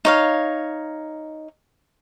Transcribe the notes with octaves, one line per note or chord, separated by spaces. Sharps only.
D#4 C#5 F5